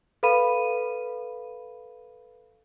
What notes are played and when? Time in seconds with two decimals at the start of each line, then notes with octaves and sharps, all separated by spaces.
0.23 A4 B4 F5 B5 D#7